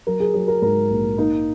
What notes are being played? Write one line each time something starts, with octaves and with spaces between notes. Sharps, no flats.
F#3 A#4
G#4
F#3 G#4
A#4
G#2 A#4
A#1
A#3 D#4